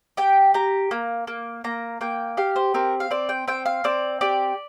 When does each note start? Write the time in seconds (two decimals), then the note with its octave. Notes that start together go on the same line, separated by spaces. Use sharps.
0.17 G4 G5
0.54 G4 A#5
0.91 A#3
1.27 A#3
1.64 A#3 A#5
2.01 A#3 G5
2.37 G4 F5
2.56 C5
2.74 C4 A#4
3.00 F5
3.11 C4 D5
3.29 G5
3.48 C4 G5
3.66 F5
3.84 C4 D5
4.21 G4 D5